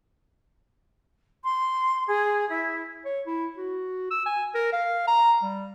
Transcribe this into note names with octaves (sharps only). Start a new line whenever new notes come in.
C6
G#4
E4
C#5
E4
F#4
E6
G#5
A#4
F5
A#5
G3